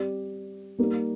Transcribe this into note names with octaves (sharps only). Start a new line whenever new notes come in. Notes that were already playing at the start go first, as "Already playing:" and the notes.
Already playing: G3 C4 G4 D5
G3 A#3 D#4